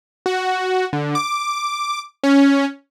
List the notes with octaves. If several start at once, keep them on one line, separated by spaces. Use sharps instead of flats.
F#4
D3
D6
C#4